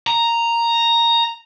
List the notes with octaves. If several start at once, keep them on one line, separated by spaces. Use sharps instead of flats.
A#5